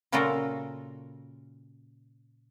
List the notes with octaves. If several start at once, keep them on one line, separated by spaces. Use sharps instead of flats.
A#2 C#3 F#3 F4 A4 A#4